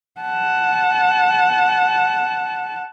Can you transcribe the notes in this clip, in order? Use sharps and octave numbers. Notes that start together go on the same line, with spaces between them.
F#5 A5